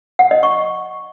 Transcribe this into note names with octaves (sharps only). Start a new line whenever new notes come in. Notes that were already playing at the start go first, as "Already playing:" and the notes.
F#5
D#5
C#6